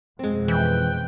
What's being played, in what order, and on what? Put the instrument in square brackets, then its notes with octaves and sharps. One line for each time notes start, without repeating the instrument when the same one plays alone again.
[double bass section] F2 B2 [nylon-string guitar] G#3 C4
[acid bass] E3 [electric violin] G5 F#6